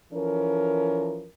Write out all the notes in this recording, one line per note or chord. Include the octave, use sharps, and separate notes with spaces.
E3 F3 C#4 A4 A#4